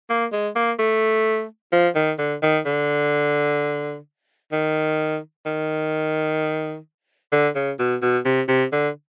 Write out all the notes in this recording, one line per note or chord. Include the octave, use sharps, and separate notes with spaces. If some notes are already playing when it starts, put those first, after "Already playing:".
A#3
G#3
A#3
A3
F3
D#3
D3
D#3
D3
D#3
D#3
D3
C#3
B2
B2
C3
C3
D3